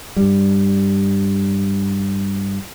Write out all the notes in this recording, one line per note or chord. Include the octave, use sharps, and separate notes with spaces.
G2 G3